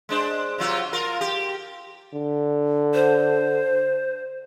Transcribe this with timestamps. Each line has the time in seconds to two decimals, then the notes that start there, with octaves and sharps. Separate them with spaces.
0.09 G#3 D4 C5
0.58 C3 F#3 F4
0.93 F4 A#4
1.21 G4
2.13 D3
2.94 C5